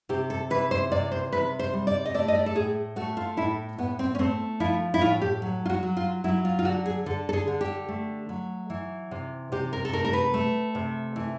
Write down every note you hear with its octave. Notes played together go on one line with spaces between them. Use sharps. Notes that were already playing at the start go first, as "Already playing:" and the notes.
C3 G4
A4
E3 B4
C5
C3 D5
C5
C3 B4
C5
G3
D5
D#5
A3 D5
D#5
D5
A4
A2 G#4
A3 F#4
F4
A2 E4
A2 B3
C4
C#4
A3 C4
F3 E4
E4
A2 F4
G4
F#3
F4
F#4
F#3
F4
F#3 E4
F4
F4
D3 F#4
G#4
D3 A4
A4
G#4
D3
G4
A3
F#3
E3
C3
C3 G4
A#4
A4
A3 A#4
A#4
B4
A3
C3
E3